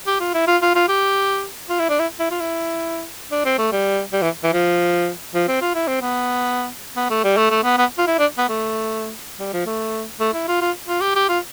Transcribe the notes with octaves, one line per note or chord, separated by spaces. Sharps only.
G4
F4
E4
F4
F4
F4
G4
F4
E4
D4
E4
E4
F4
E4
D4
C4
A3
G3
G3
E3
E3
F3
F3
C4
F4
E4
C4
B3
B3
A3
G3
A3
A3
B3
B3
F4
E4
D4
B3
A3
G3
F3
A3
A3
E4
F4
F4
F4
G4
G4
F4